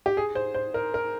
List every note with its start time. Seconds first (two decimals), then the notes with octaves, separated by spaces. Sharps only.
0.06 G4
0.17 G#4
0.35 C5
0.54 C5
0.74 A#4
0.94 A#4